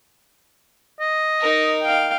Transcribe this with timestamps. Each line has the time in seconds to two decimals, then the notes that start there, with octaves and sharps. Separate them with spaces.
1.00 D#5
1.40 D#4 A#4
1.82 F5 G5